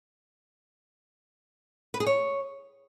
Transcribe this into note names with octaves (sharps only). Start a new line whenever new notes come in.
B4
G#4
C#5